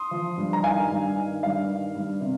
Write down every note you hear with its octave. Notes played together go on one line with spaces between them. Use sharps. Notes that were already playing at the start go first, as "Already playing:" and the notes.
Already playing: C6 D#6
F3
G2
A#5
D#3 F5 G#5
G2
D#3
G2 F5
D#3
G2
C3